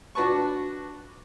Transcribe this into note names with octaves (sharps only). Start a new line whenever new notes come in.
D4 F#4 B4 A5 C#6